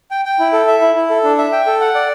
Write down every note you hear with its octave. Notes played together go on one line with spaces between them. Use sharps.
G5
G5
E4
A4
E5
E4
E4
A4
D4
E5
G5
A4
F#5
D5